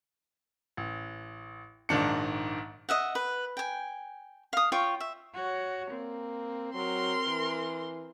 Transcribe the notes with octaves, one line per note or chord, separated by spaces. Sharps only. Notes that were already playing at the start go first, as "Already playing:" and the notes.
A1
A#1 G#2 D#3 D4 C#7
D#5 E5 F#5
B4
G5 G#5
F5 D#6
F4 C#5 G5 C#6
E5
F#4 C#5
A#3 C4
F#3 A#4 C6
E3